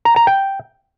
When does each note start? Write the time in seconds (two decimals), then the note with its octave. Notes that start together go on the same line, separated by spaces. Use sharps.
0.05 A#5
0.16 A#5
0.27 G5